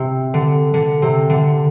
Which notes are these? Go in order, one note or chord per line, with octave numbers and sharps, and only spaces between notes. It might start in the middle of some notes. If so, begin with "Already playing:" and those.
Already playing: C3
D3
D3
C3
D3